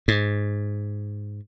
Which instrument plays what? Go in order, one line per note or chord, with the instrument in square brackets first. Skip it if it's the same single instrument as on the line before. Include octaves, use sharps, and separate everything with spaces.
[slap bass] G#2